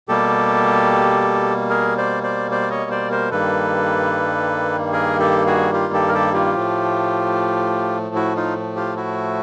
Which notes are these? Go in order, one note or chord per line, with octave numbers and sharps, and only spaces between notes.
B2 G3 A#3 G4 A4
G#4 A#4
C5 D5
C5 D5
C5 D5
C#5 D#5
C5 D5
A#4 C5
G2 D#3 G3 A#3 A4 B4
G#4 A#4
G4 A4
F#4 G#4
F4 G4
G4 A4
A#4
G4 A4
F4 G4
A2 F3 A3
E4 F#4
D#4 F4
F4 G4
E4 F#4